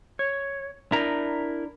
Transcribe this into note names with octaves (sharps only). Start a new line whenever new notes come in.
C#5
D4 E4 A#4 A#5